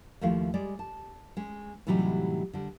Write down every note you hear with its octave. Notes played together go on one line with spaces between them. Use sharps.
D#2 F3 A3 E4 F5
G3 G#3 D5
A5
G#3 C#4
A2 C3 E3 F#3 G3 D#4
D3 G3